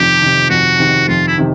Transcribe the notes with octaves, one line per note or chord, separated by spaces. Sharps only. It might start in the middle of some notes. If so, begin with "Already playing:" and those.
Already playing: F2 C3 D#3 G4
C3 D#3
F2 F#4
C3 D#3
F2 F4
E4
C3 D#3